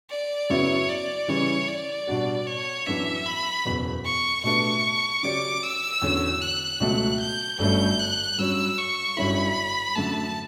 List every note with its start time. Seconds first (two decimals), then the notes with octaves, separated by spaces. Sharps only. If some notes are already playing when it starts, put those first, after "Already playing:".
0.10 D5
0.50 F#2 C#3 F#3 B3 E4 C#5
0.89 D5
1.28 C#3 E3 G3 C#5
1.68 D5
2.07 B2 G3 D4 F#4
2.47 C#5
2.86 F#2 E3 B3 D4 E5
3.26 B5
3.65 F#1 E2 B2 F#3 B3
4.05 C#6
4.44 B2 A3 D4 G4 B4 C#6
5.23 C#3 F#3 C#4 G4 D5 D6
5.63 E6
6.02 E2 D3 F#3 C#4
6.41 F#6
6.80 C#2 B2 F#3 A3
7.20 G6
7.59 G1 G2 F#3 A3 C#4 G6
7.99 F#6
8.38 G2 F#3 C#4 E6
8.78 C#6
9.17 G1 G2 F#3 C#4 E4 B5
9.95 F#2 D3 A3 A5